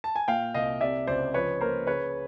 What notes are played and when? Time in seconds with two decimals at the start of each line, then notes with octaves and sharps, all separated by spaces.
0.04 A5
0.16 G#5
0.28 A#2 F5 G5
0.54 C2 D#5 F5
0.81 C3 D5 E5
1.07 C#2 C5 D5
1.34 F3 B4 C#5
1.61 A#3 A#4 C5
1.87 C#3 B4 C#5